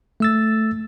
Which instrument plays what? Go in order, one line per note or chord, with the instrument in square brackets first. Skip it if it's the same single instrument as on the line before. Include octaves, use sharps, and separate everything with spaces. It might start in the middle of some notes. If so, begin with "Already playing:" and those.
[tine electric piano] A3 E6 A6